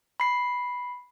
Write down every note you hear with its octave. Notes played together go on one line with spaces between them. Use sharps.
B5 C7